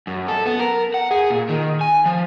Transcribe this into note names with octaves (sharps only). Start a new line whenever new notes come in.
F#2
A4
B3
A#4
F#5
G#4
A#2
D#3
G#5
F3